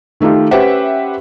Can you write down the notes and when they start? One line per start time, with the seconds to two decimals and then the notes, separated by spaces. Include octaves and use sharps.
0.20 D#3 A3 D#4 F4 G4
0.51 C#4 G4 B4 C5 E5 F#5